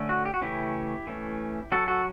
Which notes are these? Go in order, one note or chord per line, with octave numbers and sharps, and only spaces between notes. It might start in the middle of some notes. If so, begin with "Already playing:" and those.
Already playing: D3 A3 C#4
F#4
G4
F#4
C#3 E3 A3 C#4 E4 G4
E3 A3 C#4
F#3 C#4 F#4 A4
F#4 A4